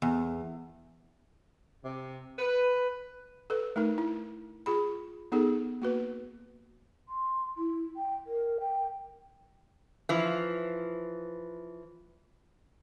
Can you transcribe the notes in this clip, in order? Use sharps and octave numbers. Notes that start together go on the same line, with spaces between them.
E2
C3
B4
A4 B4
A3 D#4 A#4
E4
F4 G#4 B5
B3 D#4 G#4 A4
A#3 F#4 B4
C6
E4
G5
A#4
G5
E3 F3